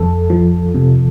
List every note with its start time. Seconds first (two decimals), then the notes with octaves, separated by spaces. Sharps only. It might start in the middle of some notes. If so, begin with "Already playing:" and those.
Already playing: F2 A4
0.30 F3
0.74 C3